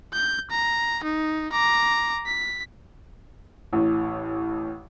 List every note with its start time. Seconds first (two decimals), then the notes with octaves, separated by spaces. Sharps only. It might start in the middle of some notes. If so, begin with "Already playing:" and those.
0.13 G6
0.50 A#5
1.04 D#4
1.52 A#5 D6
2.26 B6
3.72 A1 A2